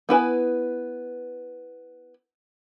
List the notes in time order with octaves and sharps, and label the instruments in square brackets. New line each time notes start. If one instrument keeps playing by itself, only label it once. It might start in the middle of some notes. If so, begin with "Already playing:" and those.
[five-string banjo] B3 E4 B4 G#5